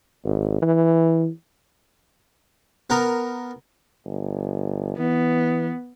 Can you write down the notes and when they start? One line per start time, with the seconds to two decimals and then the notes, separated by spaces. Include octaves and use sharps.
0.25 G#1
0.62 E3
2.90 B3 A#4
4.06 G1
4.98 E3 B3